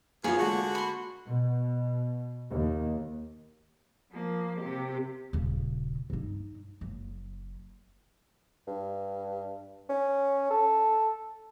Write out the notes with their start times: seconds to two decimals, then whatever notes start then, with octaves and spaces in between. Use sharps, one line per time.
0.24 E2 A#3 F4 G#4 C#5
0.39 D3 G#3 A#3 F#4
0.75 B5 C6
1.27 B2
2.50 D#2
4.12 F3 A#3
4.61 C3 G4
5.33 D#1 C#3
6.10 G2 D#4
6.81 F#1
8.67 G2
9.89 C#4
10.51 A4